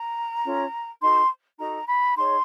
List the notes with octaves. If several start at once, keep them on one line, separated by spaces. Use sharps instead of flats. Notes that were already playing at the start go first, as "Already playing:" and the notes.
Already playing: A#5
C#4 F4 A4
D#4 F#4 A4 C6
D#4 F#4 A4 A#5
B5
D#4 G#4 C#5 C6